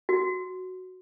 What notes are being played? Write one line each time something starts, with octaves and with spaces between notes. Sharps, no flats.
F#4